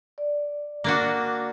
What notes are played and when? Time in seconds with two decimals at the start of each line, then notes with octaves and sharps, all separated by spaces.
0.18 D5
0.84 A#3 D4 F#4